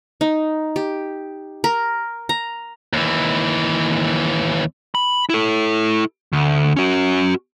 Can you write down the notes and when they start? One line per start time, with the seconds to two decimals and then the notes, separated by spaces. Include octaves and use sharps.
0.21 D#4
0.76 G4
1.64 A#4
2.29 A#5
2.93 D#2 E3
4.95 B5
5.30 E4 A4
6.33 D2
6.77 C#4 F#4